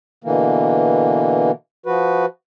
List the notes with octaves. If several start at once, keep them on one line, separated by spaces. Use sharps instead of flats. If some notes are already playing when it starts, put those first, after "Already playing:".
B2 D3 E3 A#3
F3 F#4 B4